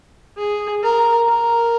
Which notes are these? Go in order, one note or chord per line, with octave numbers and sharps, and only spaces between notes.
G#4
A#4
A#4